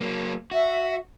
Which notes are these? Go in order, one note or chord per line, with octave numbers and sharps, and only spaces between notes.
F#3 A#3
F#4 E5